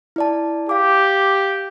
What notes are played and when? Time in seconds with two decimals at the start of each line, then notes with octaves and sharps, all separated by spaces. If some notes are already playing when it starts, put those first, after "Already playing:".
0.16 E4 D5 A5
0.69 G4 F5 D6